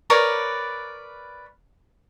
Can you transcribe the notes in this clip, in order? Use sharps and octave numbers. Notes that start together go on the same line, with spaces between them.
A#4 B4 C#5 D5